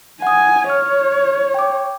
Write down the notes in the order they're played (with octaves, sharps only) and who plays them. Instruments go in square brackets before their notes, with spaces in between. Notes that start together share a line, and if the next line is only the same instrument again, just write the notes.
[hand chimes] F#5 D#6 [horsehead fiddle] G#5
[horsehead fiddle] C#5 [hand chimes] F6
[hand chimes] G5 D6